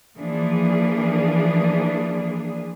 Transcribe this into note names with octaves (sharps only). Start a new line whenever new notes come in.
E3 F3 A#3 D4 G#4